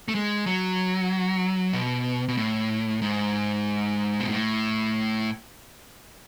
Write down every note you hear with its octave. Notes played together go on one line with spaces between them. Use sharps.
A3
G#3
F#3
B2
B2
A2
G#2
B2
A2